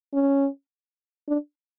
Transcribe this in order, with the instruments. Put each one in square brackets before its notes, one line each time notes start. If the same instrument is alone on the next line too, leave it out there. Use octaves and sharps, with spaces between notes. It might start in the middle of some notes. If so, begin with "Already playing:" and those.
[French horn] C#4
D4